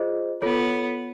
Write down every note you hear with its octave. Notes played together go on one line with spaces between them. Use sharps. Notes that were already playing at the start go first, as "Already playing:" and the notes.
Already playing: F4 G#4 C5 D#5
B3 F4 A4 C#5